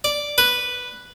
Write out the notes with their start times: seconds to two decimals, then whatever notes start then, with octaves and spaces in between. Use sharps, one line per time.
0.04 D5
0.38 B4